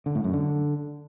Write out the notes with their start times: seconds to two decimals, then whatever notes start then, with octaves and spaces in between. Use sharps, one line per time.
0.06 D3
0.15 A2
0.24 F#2
0.33 D3